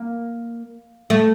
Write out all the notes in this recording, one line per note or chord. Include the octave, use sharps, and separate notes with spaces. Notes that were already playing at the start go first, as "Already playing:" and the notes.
Already playing: A#3
A3